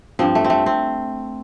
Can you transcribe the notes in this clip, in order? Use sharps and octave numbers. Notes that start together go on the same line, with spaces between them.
G2 F3 C4
A3
C4
A3
C4